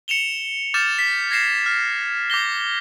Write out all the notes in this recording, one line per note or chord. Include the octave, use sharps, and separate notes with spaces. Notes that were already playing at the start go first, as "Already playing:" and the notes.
C#7 E7 F7 G7
D6 F6 G6 A6 E7
B6
G#6 A#6 C7 E7
F6
D6 G6 A#6 G7